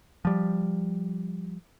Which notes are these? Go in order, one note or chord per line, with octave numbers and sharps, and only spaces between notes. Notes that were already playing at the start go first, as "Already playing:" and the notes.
F3 G3